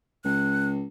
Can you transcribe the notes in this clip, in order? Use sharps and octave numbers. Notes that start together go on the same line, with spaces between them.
C#2 F#6